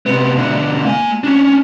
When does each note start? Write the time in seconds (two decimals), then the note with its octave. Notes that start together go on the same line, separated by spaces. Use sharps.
0.06 C3 B3
0.37 B2 D3
0.86 A#3 G#5
1.24 C#4 D4